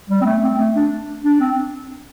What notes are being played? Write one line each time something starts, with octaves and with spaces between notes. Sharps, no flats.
G3
C4
A3
C4
A3
D4
D4
C4